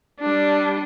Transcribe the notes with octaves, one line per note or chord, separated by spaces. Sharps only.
G3 D4